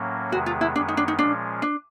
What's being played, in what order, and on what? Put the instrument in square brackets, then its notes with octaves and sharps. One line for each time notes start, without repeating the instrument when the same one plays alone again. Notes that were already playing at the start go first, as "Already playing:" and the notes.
Already playing: [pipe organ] A2 F#3 A#3 C#4
[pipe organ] E2 C3 D#3 G#3 B3 [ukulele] F#4
[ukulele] F4
E4
[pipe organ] F#2 D#3 G#3 B3 [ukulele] D4
[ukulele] D#4
D4
D#4
[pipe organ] A#2 F3 G#3 C#4 [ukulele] D4
[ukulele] D4